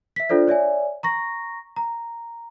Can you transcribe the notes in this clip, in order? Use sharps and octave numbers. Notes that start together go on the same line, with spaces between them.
E5 B6
D4 F4 A4 C5 D5
C#5 D5 E5 G#5
A#5 C#6 A#6
A#5